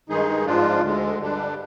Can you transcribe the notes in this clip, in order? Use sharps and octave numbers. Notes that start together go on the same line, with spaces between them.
G2 D#3 G#3 D#4 G#4
G#2 F3 G#3 D4 F4
D2 D3 G#3
G2 D3 G3 D4